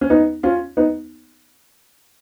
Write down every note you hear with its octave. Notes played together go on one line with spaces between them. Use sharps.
C#4
B3 D#4
C#4 F4
B3 D#4